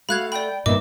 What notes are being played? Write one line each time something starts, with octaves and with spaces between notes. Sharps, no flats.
A3 F#4 F5 B5 F#6 G#6
D5 G5 B5
G2 A#2 D#3 B3 E4 D#5 E5 D6